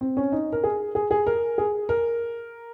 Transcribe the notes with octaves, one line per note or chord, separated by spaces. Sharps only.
C4
C#4
D#4
A#4
G#4
G#4
G#4
A#4
G#4
A#4